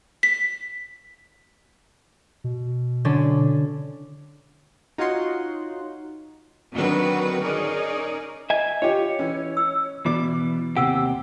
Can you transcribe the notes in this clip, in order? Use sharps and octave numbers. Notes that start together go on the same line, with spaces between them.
B6
B2
D3 C#4 D4
D#4 F4 F#4 C#5 F#5 C6
D3 D#3 F#3 C4 F#4 B4
C#4 D#4 G#4 A#4 D5
D#5 E5 G#5
F4 G4 C#5 D#5
E3 C#4
E6
B2 E3 D5 D6
D#2 C3 G4 F#5 E6